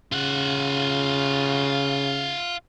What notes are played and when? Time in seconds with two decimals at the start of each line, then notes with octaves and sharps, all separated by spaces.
0.12 C#3 F4 F#5